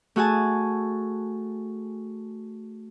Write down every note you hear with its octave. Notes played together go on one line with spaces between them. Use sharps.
A3 F#4 G#4 G#5 A5